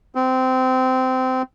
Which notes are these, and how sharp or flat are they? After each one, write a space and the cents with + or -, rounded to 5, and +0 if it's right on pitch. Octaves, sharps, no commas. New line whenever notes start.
C4 -20